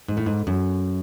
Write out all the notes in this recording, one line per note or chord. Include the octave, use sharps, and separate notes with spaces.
G#2
A2
G#2
F#2